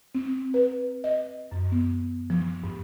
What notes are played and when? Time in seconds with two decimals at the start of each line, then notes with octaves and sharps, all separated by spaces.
0.15 C4
0.54 B4
1.04 D#5
1.52 F#2
1.72 B3
2.30 F3
2.64 G2